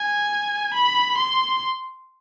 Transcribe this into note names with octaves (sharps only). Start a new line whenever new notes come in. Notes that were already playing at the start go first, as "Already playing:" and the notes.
Already playing: G#5
B5
C6